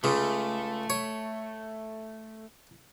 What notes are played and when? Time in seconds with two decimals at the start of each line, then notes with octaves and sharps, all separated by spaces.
0.04 C#2 C#3 A3
0.90 C#5